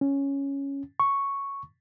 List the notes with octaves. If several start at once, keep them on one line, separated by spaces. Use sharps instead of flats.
C#4
C#6